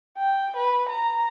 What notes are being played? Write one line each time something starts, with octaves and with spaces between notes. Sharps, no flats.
G5
B4
A#5